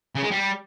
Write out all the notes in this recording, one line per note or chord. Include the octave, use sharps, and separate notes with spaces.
C#3
G#3
G3